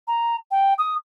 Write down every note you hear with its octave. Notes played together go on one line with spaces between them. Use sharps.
A#5
G5
D#6